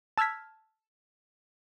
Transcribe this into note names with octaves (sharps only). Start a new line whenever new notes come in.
A5 E6 F6 G#6 B6